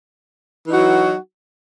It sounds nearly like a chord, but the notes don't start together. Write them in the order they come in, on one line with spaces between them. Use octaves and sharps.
E3 D#4 F#4 F#3